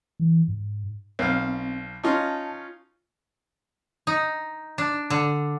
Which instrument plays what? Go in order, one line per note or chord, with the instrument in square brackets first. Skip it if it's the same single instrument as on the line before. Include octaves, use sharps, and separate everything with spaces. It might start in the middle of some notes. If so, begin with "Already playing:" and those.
[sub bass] E3
G#2
[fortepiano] B1 F5 [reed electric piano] C4
[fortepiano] C#4 D#4 F4 [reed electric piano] A5
[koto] D#4
D4
D3